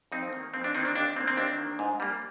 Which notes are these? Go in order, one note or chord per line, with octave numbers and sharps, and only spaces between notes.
F2 C4 D#4
D#3 A#3
F2 C4
D4
D#3 A#3 C4 D#4
D4
D#2 D4
D#3 A#3 C4
C4
D#2 D4
D#3 A#3
G#2
G3 A#3